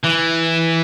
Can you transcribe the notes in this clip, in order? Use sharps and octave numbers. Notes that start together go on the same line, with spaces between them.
E3